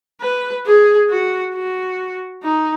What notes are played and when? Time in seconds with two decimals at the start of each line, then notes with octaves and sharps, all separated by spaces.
0.21 B4
0.66 G#4
1.10 F#4
1.54 F#4
2.43 D#4